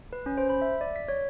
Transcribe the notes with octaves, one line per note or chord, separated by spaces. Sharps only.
B4
C#4
C5
B5
E5
D5
B6
C#5